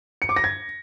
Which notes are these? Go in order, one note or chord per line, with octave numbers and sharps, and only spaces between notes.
C#7
D6
A#6
G#6